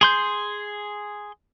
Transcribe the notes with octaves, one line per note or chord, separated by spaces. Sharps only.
G#4 C6 G6